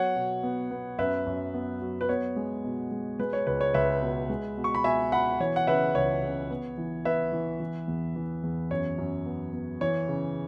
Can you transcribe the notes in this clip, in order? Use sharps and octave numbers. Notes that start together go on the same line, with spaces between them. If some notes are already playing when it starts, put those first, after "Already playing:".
Already playing: F#3 B3 C#5 F#5
B2
B3
B3
F#2 B4 E5
F#2
B3
F#3
B4
B3 C#5
G#3
B2
G#3
G#3 B4
C#5
C#2 B4
C#5
C#2 B4 E5
B2
G#3
B2
C#6
B5
B2 E5 G#5
B2 F#5 B5
E3 C#5
F#5
C#3 B4 E5
C#2 C#5
C#3
B3
E3
B3 B4 E5
E3
E3
E2
E3
E2
F#2 C#5
F#2
B3
B3
E3 C#5
C#3